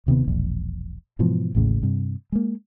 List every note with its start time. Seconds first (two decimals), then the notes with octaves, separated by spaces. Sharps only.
0.06 D#1 C3 D#3 B3
0.28 E1 A#1
1.19 G#2 B2 E3 F3
1.55 A1 D#2 A2 C#3
1.83 G2 C3
2.32 G#3 A#3